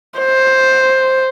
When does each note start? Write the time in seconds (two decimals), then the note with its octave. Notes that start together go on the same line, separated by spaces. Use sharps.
0.19 C5